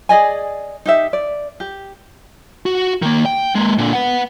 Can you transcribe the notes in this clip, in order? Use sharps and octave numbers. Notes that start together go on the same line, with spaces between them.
G#4 D5 D#5 G#5
D#4 G4 E5
D5
G4
F#4
D#3 A#3
G5
G#3 A#3
A#2 D3
B3 F#5